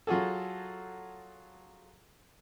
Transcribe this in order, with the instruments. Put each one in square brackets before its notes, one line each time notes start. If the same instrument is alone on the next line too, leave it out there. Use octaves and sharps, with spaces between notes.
[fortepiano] F#3 F4 F#4 G#4 A4